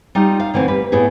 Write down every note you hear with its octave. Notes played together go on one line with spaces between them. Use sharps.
G3 D#4 F4
F5
D3 E3 A3 C4
G3 B4
A2 B3 E4 G#4